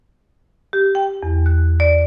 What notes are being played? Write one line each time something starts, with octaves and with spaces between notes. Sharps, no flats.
G4
G5
E2
F#6
D5